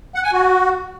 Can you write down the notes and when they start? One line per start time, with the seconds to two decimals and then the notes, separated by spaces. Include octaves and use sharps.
0.15 F#5
0.24 G#5
0.33 F#4